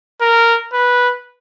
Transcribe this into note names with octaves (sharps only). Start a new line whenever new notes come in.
A#4
B4